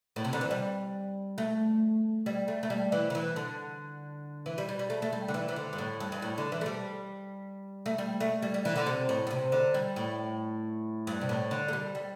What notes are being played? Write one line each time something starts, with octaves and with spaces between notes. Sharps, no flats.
A2
C3
D3
E3
G3
A3
G3
A3
A3
G3
E3
D3
E3
D3
E3
G3
G3
G3
A3
A3
G3
D3
E3
E3
D3
G2
A2
G2
G2
A2
D3
E3
A3
G3
A3
G3
A3
G3
G3
E3
D3
C3
A2
A2
C3
D3
G3
A2
G2
C3
A2
D3
A3
G3
G3